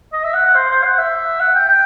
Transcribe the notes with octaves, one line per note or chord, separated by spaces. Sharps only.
D#5
E5
F#5
F#5
C5
C5
F#5
E5
F#5
G5
G5